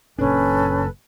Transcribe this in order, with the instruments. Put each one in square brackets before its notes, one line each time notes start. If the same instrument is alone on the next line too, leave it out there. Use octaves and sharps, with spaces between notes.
[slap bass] F#1 A#2 D4 [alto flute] C#4 [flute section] A4 B4 G#5